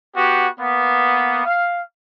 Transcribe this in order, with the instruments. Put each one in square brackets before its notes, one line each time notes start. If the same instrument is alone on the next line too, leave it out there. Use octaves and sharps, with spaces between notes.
[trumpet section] B3 F#4 G4
A#3 B3
F5